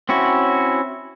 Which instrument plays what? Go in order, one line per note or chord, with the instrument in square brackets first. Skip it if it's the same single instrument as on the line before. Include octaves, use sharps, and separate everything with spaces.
[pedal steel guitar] C4 C#4 E4 F#4